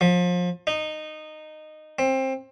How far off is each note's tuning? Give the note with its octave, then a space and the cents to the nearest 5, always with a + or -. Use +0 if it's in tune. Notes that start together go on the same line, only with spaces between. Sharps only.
F3 +30
D#4 -15
C4 +20